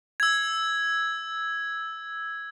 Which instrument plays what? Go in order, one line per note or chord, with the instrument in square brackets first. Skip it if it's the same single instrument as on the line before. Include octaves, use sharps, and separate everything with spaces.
[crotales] E6 G#6